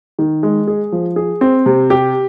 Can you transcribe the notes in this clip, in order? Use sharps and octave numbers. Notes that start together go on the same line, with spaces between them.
D#3
G#3
G#4
F3
G#4
C4
C3
G4